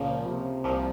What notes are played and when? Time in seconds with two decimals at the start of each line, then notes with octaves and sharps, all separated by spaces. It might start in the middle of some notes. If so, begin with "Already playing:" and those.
Already playing: C#2 A#2 C#3 F3 A#3
0.26 C3
0.64 C2 A#2 F3